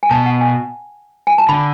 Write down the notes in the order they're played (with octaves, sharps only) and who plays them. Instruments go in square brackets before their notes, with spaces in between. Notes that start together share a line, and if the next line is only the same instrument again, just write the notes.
[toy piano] G#5
[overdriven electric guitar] B2 [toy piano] A5
[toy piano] F#5
G#5
G#5
A5
[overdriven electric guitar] D3 [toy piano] B5